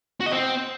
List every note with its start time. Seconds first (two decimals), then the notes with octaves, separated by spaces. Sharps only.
0.21 F#4
0.26 D#5
0.32 C4